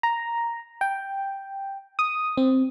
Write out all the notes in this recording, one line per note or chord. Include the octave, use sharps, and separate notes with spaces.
A#5
G5
D#6
C4